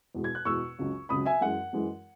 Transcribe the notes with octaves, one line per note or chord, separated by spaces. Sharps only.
E2 B2 G#3
G#6
F#6
E2 B2 G#3 C#6 E6
C#2 C#3 F#3
C#2 C#3 F#3 B5 D#6
E5 G#5
F#2 E3 G#3 F#5
F#2 E3 G#3